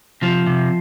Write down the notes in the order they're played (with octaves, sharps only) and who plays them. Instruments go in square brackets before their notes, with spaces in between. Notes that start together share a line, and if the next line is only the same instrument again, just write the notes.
[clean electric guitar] C3 F3
C3